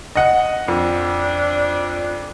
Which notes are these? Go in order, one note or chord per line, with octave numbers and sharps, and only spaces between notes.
D#5 F#5
F2 D4